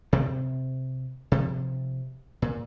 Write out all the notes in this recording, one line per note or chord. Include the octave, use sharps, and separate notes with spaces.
C3 C4
C3 F3
A#2